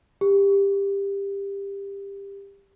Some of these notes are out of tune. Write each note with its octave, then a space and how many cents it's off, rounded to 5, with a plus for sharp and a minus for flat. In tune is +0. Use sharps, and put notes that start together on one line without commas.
G4 +20